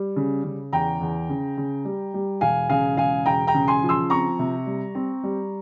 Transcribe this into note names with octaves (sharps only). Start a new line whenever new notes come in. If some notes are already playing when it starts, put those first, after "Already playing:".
Already playing: G3
C#3
C#3
E2 G5 A#5
E2
C#3
C#3
G3
G3
E1 F5 G#5
C#3 F5 G#5
E1 F5 G#5
E1 G5 A#5
G5 A#5
C#3
G#5 C6
F3
C6 E6
C4 A#5 C#6
C3
G3
C4
G3